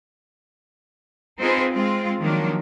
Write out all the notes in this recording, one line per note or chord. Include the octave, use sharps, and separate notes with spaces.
C4 D#4 F4 G#4 B4
G#3 C4 F4
D#3 F3 F#3 A#3 D4